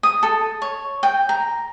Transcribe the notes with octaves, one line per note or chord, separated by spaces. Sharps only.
D#6
A4
C#5
G5
A#5